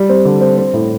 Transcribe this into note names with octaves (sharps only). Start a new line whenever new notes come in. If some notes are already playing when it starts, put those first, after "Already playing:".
Already playing: G3
C4
D3
C4
C4
A2